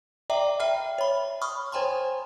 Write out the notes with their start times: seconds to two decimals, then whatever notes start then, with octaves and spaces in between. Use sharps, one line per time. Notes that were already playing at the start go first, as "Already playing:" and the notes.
0.30 D5 E5 G5 A#5 D6
0.60 E5 G5 B5 F6
0.98 C#5 B5
1.41 B5 C#6 D#6 F6
1.72 C5 C#5 G5 G#5 A#5 C6